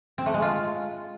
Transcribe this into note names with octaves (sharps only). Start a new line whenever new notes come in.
C4
A3
G#3
F4